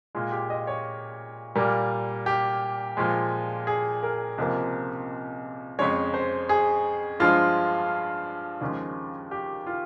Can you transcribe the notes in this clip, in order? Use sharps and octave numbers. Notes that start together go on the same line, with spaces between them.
A#2 G#3 F4
G4
D#5
C#5
A#2 G3 A#3
G4
A#2 F3 G#3
G#4
A#4
C#2 C3 F3 A#3
F2 C#3 G#3 C#5
C5
G#4
G2 F3 G#3 F4
D#2 C#3 F3 G#3
G4
F4